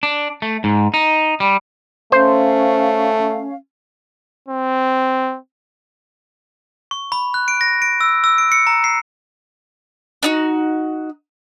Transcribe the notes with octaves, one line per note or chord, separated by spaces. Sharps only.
D4
A3
G#2
D#4
G3
A3 C#4 C5 F5
C4
C#6
B5
F#6
D7
A#6
D7
E6
E6
D7
C#7
A#5
C7
D4 D#4 F#4